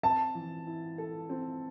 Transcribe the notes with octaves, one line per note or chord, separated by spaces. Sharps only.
C4 A5
E3
E4
A4
C4